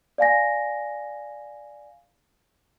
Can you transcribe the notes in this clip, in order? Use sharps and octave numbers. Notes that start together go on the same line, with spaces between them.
D5 F5 G#5 A#6